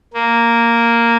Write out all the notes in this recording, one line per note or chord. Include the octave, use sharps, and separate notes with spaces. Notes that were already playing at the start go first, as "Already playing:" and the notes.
A#3